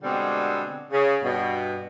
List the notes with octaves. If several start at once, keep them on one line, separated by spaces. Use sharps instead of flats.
B2 D3 G3 G#3 C4
C#3
G2 B2